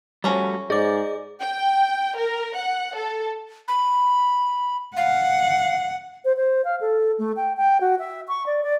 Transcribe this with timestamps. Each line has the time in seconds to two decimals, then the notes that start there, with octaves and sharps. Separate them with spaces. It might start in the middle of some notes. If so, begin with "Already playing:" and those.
0.24 F3 G3 A3 C#4 F#4 A#5
0.70 G#2 G#4 D5 D#5 D6
1.40 G5
2.16 A#4
2.55 F#5
2.95 A4
3.68 B5
4.97 F5 F#5
6.25 C5
6.37 C5
6.65 F5
6.81 A4
7.19 A3
7.36 G5
7.57 G5
7.81 F#4
7.99 E5
8.28 C#6
8.46 D5
8.63 D5